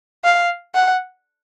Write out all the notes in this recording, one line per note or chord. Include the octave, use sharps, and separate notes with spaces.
F5
F#5